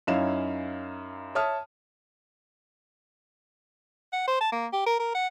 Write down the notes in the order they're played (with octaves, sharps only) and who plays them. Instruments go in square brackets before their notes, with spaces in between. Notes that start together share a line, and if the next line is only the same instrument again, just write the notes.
[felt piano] F#2 C#4 D#4 E4 F5 E7
C#5 E5 A5 D#6 F6
[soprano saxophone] F#5
C5
A5
A#3
G4
A#4
A#4
F#5